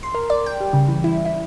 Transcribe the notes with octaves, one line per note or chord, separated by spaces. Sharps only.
C6
A#4
D5
G5
G3
C#3
E3
E4
E4